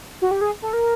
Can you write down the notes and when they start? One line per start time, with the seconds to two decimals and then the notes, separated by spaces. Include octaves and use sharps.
0.22 F#4
0.31 G4
0.41 G#4
0.62 A4
0.73 A#4